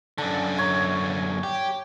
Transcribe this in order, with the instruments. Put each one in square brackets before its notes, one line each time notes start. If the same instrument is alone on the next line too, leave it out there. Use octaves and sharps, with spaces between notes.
[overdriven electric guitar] F#2 D3 [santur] D4
[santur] C#5 A#5
[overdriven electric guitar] G4